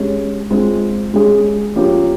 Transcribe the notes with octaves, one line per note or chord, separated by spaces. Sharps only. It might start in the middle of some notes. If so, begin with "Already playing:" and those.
Already playing: G#3 C#4 G4
G#3 C4 F4
G#3 C#4 G#4
F3 A#3 C#4 G4